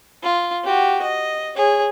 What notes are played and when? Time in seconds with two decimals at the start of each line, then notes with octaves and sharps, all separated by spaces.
0.23 F4
0.64 F#4 G4
1.02 D#5
1.56 G#4 C#5